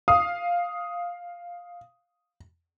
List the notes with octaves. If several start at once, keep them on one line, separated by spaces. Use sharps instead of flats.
F5 D#6